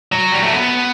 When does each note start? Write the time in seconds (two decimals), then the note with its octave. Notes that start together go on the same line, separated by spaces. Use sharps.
0.12 F#3
0.32 G3
0.42 A3
0.52 B3